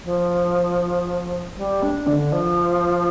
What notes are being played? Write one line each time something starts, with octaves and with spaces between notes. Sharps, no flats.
F3
G3
D4
D3
F3